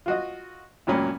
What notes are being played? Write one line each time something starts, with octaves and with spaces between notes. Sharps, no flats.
F4 F#4 D#5
C#2 G2 A#2 F#3 C#4 B5